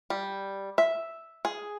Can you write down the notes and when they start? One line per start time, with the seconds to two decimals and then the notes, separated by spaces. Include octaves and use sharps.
0.10 G3
0.78 E5
1.45 G#4